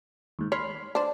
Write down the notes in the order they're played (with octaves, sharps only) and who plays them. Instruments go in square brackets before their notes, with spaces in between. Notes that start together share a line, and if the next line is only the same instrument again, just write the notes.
[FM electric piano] D#2 G#2
[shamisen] C#5 [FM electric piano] B5 C6 F6
[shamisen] D4 C5 [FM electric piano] D5